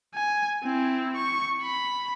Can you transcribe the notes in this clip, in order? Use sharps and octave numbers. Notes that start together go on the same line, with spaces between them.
G#5
C4 E4
C#6
B5